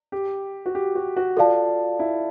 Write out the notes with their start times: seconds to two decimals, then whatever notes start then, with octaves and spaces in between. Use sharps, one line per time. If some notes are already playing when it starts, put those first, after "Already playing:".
0.12 G4
0.66 F#4
0.75 G4
0.95 F#4
1.16 F#4
1.37 F4 A4 D5 F5 A5
1.99 E4